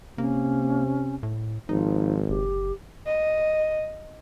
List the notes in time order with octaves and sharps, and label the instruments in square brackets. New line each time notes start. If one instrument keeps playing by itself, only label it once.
[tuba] C3 [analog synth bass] A#3 [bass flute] C#4
[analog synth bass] A2
[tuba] G#1 [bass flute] F3 [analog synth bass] D#4
[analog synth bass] F#1 [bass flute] G4
[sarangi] D#5